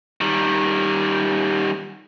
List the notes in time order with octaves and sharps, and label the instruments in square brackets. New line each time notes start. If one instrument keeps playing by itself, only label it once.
[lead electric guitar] D#3 G3